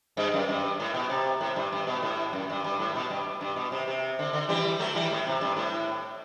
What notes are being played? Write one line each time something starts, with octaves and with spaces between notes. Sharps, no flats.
G2
F#2
G2
A2
B2
C3
A2
G2
G2
B2
A2
F#2
G2
G2
A2
B2
G2
G2
B2
C3
C3
D3
D3
E3 G3
F#3 A3
E3 G3
A2
C3
G2
A2